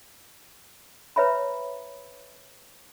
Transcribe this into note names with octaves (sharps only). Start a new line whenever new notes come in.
B4 C#5 E5 A#5 B5